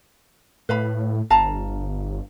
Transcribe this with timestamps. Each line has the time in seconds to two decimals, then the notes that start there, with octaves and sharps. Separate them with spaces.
0.69 A2 B4 F5 B5
1.30 G1 F5 A5 A#5